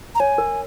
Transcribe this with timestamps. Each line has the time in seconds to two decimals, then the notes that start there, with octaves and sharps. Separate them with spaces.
0.15 A#5
0.20 C#5 G#5
0.38 A#4